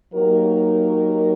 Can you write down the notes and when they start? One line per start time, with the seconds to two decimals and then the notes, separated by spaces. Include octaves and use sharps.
0.13 F#3 A#3 D#4 G4 A#4